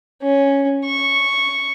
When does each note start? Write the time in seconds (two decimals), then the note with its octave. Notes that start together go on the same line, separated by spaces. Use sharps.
0.22 C#4
0.85 C#6